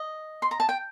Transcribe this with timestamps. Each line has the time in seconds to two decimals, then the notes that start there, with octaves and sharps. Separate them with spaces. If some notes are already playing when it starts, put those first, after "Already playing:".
Already playing: D#5
0.42 C6
0.51 A#5
0.60 A5
0.69 G5